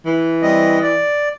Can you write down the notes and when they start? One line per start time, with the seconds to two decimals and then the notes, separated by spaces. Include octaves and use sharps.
0.06 E3
0.42 G3 C4 D#5
0.82 D5